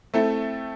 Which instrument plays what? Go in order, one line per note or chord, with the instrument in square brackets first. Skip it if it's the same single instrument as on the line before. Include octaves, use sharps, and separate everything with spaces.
[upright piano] A3 C4 E4 A4